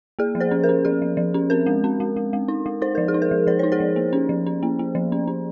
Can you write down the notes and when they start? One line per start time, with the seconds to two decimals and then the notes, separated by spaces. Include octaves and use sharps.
0.19 A#3 G#4
0.35 F3
0.40 G#4 C5
0.51 C#4
0.64 A#4
0.69 C#4
0.85 F3 G#4
1.02 F3
1.17 F3
1.34 C#4
1.50 C4 A#4
1.66 G#3
1.84 C4
2.00 G#3
2.16 G#3
2.33 G#3
2.48 D#4
2.66 G#3
2.82 D#4 C5
2.95 F3 A#4
3.08 G#4
3.14 D#4
3.22 A#4
3.31 F3
3.47 F3 C5
3.59 D#4 C#5
3.72 G#4 C5
3.80 F3
3.96 A#3
4.13 C#4
4.29 F3
4.46 C#4
4.63 A#3
4.79 A#3
4.95 F3
5.12 C#4
5.28 C#4